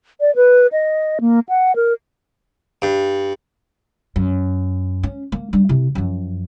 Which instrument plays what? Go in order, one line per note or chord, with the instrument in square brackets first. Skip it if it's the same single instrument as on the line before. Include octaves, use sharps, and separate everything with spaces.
[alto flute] D5
B4
D#5
A#3
F#5
A#4
[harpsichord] G2
[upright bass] F#2
C#4
A#3
G3 D4
C3 E4
F#2 F3